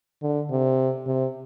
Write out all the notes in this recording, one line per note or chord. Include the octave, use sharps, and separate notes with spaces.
D3
C3
C3